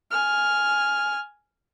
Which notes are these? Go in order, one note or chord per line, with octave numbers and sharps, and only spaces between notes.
G#5 F6